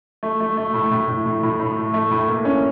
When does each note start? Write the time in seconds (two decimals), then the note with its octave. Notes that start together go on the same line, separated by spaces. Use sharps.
0.23 A3
0.40 A3
0.57 A3
0.74 A2
0.91 A2
1.08 A2
1.26 A2
1.43 A2
1.60 A2
1.76 A3
1.94 A3
2.11 A2
2.28 A#3
2.45 C#4